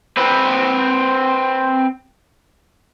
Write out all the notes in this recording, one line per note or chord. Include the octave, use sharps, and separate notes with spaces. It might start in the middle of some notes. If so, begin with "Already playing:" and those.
C4 B4